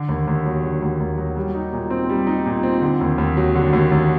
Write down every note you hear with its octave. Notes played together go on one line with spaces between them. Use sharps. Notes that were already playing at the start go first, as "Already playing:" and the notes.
Already playing: D3
D#2
D#2
F#3
D3
D#2
D#2
F#3
G3
D#4
A#2
C4
G3
D#4
A#2
C4
D3
D#2
D#2
F#3
D3
D#2
D#2